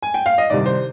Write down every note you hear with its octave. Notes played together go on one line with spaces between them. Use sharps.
G#5
G5
F5
D#5
C2 C3 D#3 D5
C5